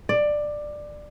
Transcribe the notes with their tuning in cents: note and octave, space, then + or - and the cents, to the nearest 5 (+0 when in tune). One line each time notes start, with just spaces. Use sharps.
D5 +15